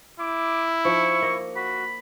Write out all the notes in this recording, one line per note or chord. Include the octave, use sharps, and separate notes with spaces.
E4 D6
F3 D#4 C#6
A#3 D#5
F#4 B5